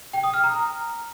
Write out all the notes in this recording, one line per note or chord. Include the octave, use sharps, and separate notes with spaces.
G5
D#6
F6
A#5